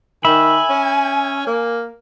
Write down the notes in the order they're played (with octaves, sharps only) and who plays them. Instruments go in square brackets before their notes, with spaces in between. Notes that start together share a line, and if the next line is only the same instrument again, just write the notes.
[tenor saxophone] D#3 [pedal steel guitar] E5 B5 [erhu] G#5
[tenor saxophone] C#4
A#3